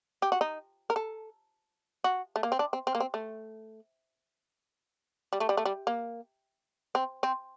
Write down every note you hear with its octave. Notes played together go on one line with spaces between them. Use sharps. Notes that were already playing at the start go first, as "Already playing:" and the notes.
G4
F#4
D#4
A#4
A4
F#4
A3
A#3
C4
D4
C4
C4
A#3
C4
A3
G3
A3
G3
A3
G3
A#3
C4
C4